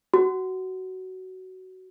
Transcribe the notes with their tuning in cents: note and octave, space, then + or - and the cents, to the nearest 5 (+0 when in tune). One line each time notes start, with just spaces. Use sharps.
F#4 +15